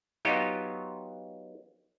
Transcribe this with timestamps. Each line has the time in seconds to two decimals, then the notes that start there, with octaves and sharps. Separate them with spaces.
0.25 F#3 B3 D#4 F4 G4